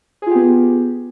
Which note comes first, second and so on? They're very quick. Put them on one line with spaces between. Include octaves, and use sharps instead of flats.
G#4 F4 G4 B3